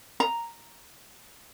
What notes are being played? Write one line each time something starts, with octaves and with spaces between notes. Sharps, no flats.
A#5